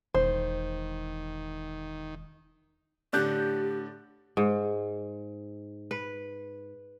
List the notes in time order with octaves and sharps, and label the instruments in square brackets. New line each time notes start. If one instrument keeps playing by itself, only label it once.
[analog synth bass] E1 [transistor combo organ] D#3 [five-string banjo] C5
[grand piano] A2 D3 [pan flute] G4 [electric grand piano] D5 F#6 G6
[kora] G#2
B4